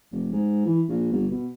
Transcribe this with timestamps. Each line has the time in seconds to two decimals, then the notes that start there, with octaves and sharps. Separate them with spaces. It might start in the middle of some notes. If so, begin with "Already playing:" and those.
0.12 F1
0.32 G#2
0.66 E3
0.89 A#1
1.12 G1
1.31 B2